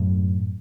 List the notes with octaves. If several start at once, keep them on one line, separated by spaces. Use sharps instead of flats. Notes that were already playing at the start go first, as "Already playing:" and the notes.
Already playing: F#2 A2